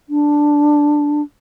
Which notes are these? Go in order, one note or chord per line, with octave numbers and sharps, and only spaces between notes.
D4